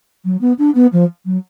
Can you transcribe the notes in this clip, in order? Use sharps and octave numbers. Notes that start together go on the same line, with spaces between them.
F#3
B3
D4
B3
F3
F#3